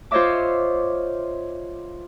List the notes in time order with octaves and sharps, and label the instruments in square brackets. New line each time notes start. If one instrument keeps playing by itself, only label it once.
[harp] F4 C5 C#5 D#5 E5 D6